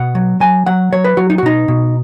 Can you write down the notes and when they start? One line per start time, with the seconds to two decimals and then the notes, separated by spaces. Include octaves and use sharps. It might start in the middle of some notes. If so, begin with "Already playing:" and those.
Already playing: B2 F#5
0.15 F#3
0.40 F#3 G#5
0.66 F#3 F#5
0.92 F#3 C#5
1.04 B4
1.17 F#3 F#4
1.30 D#4
1.38 F#4
1.43 B2 D#4
1.68 B2